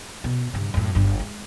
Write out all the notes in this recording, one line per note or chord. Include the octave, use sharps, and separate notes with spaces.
B2
G2 C#3
F#2 A2
G1 G2
G#3